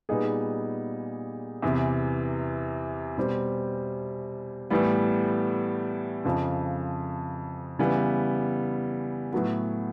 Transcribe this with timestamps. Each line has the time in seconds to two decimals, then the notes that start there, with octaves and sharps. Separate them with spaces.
0.09 A#2 G3 B3 D#4 G#4
1.62 E2 C3 E3
3.17 B2 G3 C4
4.70 A2 E3 G3 B3
6.25 F2 C#3 F3
7.79 C#3 E3 G3 B3
9.33 A2 F#3 B3